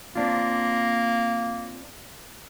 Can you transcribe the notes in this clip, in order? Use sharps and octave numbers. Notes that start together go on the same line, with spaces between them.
A#3 C4 D4 F4